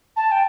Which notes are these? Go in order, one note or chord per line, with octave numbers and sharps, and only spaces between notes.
A5
G5